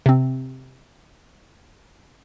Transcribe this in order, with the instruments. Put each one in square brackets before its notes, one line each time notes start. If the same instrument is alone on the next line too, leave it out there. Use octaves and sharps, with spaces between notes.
[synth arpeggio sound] C3 C4